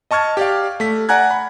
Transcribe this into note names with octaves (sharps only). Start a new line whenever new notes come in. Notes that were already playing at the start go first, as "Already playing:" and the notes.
D#5 A5 C#6 F6 G#6
G4 D5 F5
A3 B6
D5 F#5 G#5 A#5 F#6 G#6
B5